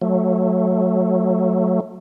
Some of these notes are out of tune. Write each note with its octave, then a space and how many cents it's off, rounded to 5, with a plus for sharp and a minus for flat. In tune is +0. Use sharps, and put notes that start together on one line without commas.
F#3 -15 A3 +0